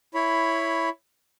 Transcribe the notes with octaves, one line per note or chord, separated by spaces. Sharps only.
E4 C#5 B5